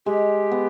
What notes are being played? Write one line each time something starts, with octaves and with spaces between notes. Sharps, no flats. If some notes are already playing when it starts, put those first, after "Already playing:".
G#3 G4
B3